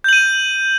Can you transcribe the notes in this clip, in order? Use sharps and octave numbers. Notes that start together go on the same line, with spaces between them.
G6 D#7 F#7